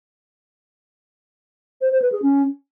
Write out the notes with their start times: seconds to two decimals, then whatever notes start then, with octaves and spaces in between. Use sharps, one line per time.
1.81 C5
1.91 C5
2.02 B4
2.12 G#4
2.22 C#4